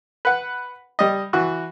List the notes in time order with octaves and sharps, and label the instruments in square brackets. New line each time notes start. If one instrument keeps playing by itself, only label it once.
[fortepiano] B4 F#5
G3 D#5
E3 F#4